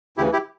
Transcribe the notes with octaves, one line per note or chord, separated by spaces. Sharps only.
D2 C#3 E3 E4 G4
E4 G4